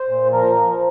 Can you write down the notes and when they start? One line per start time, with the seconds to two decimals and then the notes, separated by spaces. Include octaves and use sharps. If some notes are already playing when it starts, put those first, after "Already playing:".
Already playing: C5
0.09 A#2
0.32 F3 A#4
0.56 F3